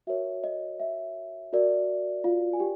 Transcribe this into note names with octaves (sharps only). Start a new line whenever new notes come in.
F#4 A#4 C#5 E5
D#5
E5
F#4 A#4 D5
F4 F5
G#5
G4 G5